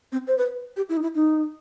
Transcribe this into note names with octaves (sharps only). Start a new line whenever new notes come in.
C4
C5
B4
G4
E4
D#4
E4
D#4